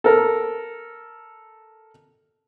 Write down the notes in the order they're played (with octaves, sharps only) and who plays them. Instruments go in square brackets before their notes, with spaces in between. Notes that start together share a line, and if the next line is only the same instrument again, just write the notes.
[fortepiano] A4 A#4